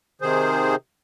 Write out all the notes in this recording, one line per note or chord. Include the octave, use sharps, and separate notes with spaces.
C3 D#3 G#4 C5